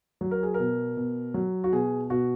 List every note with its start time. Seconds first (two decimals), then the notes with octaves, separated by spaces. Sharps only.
0.21 F#3
0.31 A#4
0.43 G#4
0.54 B2 A#4
0.97 B2
1.34 F#3
1.64 F#4
1.72 B2 G#4
2.10 B2 F#4